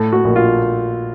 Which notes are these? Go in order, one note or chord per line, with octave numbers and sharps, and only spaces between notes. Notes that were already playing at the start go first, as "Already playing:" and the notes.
Already playing: A2 A4
F#4
A#1
F4